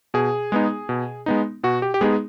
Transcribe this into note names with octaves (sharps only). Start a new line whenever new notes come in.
B2 G#4
G#3 B3 D#4
B2
G#3 B3 D#4
B2 F#4
G4
G4
G#3 B3 D#4 G#4